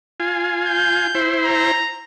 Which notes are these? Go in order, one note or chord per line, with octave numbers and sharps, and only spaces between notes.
F4 G#5
G6
E4 C5
A#5